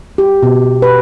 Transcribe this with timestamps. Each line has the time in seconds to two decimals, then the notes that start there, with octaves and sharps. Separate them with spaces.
0.18 G4
0.43 B2
0.82 B4